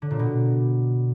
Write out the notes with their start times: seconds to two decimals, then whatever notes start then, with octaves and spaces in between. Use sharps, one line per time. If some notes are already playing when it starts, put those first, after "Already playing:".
0.02 D3
0.11 A#2
0.19 B2